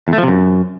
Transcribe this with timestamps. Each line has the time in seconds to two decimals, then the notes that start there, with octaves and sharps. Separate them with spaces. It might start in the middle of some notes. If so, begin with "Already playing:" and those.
0.08 E2
0.13 A3
0.18 F3
0.23 C3
0.28 F#2